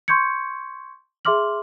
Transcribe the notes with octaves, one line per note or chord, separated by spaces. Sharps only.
C6 C#6 G6 G#6 C#7
G#4 E5 C6 D6 F6 F#7